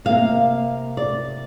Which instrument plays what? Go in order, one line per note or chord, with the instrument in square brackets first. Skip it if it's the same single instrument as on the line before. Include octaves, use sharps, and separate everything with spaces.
[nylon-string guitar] C3 A#3 F5
D5